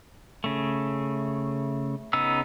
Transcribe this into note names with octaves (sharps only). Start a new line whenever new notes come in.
C#3 A3
C#3 B3 D#4 E6